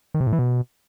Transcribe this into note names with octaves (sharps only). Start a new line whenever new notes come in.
D#3
C3
A2
E3
B2